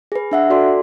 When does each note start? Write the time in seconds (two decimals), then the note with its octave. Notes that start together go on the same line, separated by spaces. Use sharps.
0.12 G#4 B4
0.31 D4 E5 F#5
0.50 F#4 A4 D5 C6